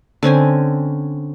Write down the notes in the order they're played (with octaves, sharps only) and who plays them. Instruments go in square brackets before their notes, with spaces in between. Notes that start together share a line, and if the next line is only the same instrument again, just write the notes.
[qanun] D3 C4 C#4 G#5